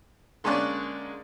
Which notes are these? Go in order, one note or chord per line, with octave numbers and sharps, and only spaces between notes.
D3 G#3 A#3 C#4 D5 F#6